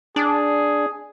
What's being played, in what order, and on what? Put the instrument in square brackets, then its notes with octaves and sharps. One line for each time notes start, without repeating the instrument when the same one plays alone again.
[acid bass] D4 [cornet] G#4